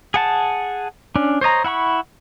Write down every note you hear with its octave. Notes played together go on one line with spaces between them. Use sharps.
G#4 F#5 A5
C#4 D4
C5 C#5 D#5 A#5
E4 F#5 B5 C#6